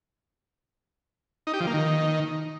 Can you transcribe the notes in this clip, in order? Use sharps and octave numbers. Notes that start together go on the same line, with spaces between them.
D#4
G4
F3
A#3
D#3